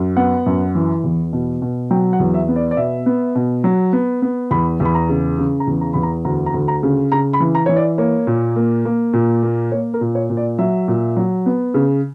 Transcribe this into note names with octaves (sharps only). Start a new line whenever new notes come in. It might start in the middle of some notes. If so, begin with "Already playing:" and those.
Already playing: F#2
B3 F#5
F#2
E3
E2
B2
B2
F#3 G5
F#5
E2
E5
B3
D5
D5
B2 E5
B3
B2
F#3
B3
B3
E2 B5
E2
B5
A#5
C#3
C#3
A#5
E2
A#5
E2 B5
A#5
D2 A#5
A#5
D2
A#5
C#3
C#3 A#5
B5
E3
A#5
E3 C#5
D5
A#3 C#5
A#2
A#3
A#3
A#2
A#3
A#3 C#5
A#4
A#2
C#5
A#2
D5
F#3 E5
A#2
F#3
B3
C#3